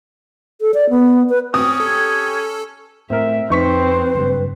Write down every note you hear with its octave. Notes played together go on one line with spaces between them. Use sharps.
A4
D5
B3
B4
C4 C#4 D#6
G4 A4 G#6
A2 C4 A#4 E5
F2 C4 D#4 B4 C5 C#6 B6
F#1 G2 G3